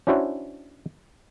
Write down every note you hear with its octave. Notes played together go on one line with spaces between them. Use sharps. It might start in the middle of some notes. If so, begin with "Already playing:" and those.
C#4 D4 E4 F#4 C5 C#5